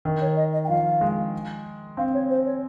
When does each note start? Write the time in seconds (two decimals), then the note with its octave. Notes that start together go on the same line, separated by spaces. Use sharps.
0.05 D#3
0.21 C#5
0.36 D#5
0.53 D#5
0.64 G5
0.69 F3 F5
1.01 G#3
1.97 C4 F5
2.14 C#5
2.30 C5
2.46 C#5